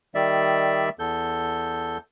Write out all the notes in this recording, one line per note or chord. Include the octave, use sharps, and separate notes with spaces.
D#3 G3 D5 E5
E2 A4 G6